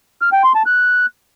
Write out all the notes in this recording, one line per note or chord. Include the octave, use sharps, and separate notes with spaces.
F6
G5
C6
A5
F#6